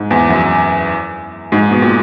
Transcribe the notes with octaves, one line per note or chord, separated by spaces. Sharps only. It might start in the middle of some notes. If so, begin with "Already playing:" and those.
Already playing: G#2
E2
F#2
G#2
B2
A#2